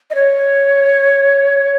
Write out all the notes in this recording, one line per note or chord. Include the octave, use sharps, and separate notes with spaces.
D#5
C#5